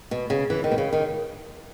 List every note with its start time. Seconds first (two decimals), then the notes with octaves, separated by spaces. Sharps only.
0.11 B2
0.30 C#3
0.50 E3
0.64 D#3
0.72 B2
0.78 C#3
0.93 D#3